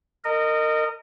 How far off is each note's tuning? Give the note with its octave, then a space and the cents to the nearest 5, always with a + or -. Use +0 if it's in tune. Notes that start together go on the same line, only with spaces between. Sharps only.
A#4 -25 D#5 -15